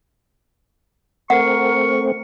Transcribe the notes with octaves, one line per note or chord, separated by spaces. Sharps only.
A3 C4 A#4 F#5 C#6